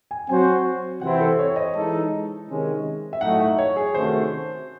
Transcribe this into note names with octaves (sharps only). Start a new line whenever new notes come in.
G#5
F#3 C4 F#4 C5 G#5
C3 E3 C4 E4 C5 F#5
A4
C#5
D#5
E3 G#3 D#4 A4
C3 D#3 G#3 C#4
E5
A2 F#3 A3 D#4 F#4 F#5
E5
C#5
G#4
C3 D#3 A3 C#4 F#4 C5